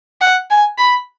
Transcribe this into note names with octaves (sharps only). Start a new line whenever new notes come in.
F#5
G#5
B5